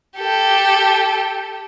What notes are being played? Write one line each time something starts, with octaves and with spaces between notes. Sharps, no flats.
G4 A4